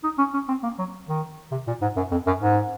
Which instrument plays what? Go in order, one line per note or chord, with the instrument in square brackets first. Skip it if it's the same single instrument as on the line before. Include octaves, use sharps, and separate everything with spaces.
[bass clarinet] D#4
C#4
C#4
C4
A#3
F#3
D#3
C3
A#2
G#2
F#2
F2
F#2
G#2